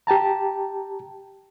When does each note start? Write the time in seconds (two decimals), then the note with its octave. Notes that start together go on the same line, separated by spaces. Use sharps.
0.07 G4 G5 A5 A#5